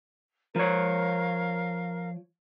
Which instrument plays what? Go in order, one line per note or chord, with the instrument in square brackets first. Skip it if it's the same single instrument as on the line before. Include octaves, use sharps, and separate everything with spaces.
[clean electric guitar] F3 C#5 [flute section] A#4 F5